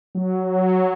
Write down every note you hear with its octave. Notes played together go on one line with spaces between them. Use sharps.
F#3